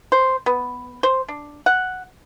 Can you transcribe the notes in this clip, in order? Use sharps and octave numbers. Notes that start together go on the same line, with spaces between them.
C5
B3
C5
D4
F#5